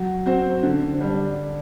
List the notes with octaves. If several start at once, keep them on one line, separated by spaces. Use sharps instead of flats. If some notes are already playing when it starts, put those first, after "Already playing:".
Already playing: F#3
C4 F#4 C5
D3
G3 D4